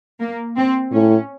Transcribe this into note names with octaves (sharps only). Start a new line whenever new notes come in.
A#3
C4
A2 C#4